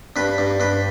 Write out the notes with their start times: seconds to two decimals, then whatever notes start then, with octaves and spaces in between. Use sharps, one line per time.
0.16 G2 B4
0.38 G2
0.60 G2 B4